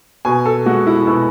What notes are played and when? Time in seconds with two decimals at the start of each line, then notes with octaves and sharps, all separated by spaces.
0.25 B2 G#5
0.46 A4
0.66 G#3 F#4
0.87 E4
1.07 B2 E4